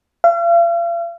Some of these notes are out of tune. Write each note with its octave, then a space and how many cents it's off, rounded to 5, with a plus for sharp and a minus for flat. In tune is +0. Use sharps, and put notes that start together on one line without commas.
F5 -40